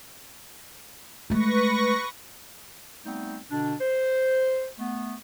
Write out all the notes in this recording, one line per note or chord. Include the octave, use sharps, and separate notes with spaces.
G#3 A3 B4 C#6 A#6
G3 A3 B3 C4 D#4
B2 D3 D4
C5
A3 B3